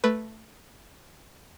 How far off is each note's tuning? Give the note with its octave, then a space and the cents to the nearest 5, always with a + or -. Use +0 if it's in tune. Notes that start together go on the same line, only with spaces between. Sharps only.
A3 +0 B4 +0